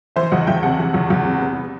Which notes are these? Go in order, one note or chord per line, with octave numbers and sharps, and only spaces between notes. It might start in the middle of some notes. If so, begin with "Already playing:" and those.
E3 C5 E5
E2 D#5 F#5
E2 E5 G5
C3 F#5 A5
E3
E2
E2
C3
B3